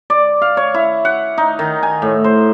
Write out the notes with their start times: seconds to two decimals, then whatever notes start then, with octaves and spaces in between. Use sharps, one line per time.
0.10 D5
0.42 F5
0.57 C#5
0.74 E4
1.05 F#5
1.38 D#4
1.59 D#3
1.83 G#5
2.02 A2
2.24 C5